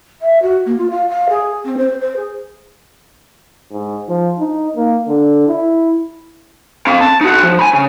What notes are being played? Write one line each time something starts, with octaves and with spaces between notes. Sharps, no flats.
E5
F#4
A#3
F4
F5
F5
G#4
C4
C5
C5
G#4
G#2
F3
D#4
A#3
D3
E4
C4 F5
A5
D#4 F#4
F3
G#5 B5
C#3